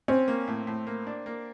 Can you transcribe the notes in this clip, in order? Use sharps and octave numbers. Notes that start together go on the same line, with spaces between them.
C4 C#4
A#3
A2
A2
A#3
D4
A#3